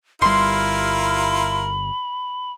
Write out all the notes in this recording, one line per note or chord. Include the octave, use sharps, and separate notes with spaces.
G1 G3 E4 F4 A#4 B5 C6